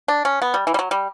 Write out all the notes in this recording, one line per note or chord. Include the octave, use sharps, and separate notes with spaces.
D4
C#4
B3
G3
E3
G3
F#3
G3